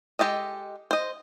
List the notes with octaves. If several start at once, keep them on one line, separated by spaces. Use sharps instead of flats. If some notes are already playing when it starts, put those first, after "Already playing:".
G#3 G4 A4 D#5
C5 D#5